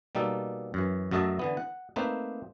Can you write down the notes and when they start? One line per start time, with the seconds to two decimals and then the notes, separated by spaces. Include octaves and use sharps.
0.15 B2 G3 A#3 D#4 A4
0.74 F#2 E3
1.11 F#2 F#3 A3 D#5 E5 A5
1.39 D3 E3 B3
1.57 F#5
1.96 A3 A#3 C4 D#4 B4 C5